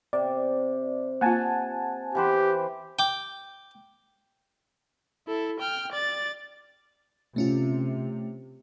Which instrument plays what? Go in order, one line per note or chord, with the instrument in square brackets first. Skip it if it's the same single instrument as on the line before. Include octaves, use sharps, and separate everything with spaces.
[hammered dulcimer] C3 [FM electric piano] D5
[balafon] A#3 F4 [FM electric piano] F#5 G#5 A5
[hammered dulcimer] E3 B4 C5 [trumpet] G4
[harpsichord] G5 D6
[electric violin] E4 A4
G5 F6
D5 A6
[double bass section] C3 [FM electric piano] A3 C#4 F4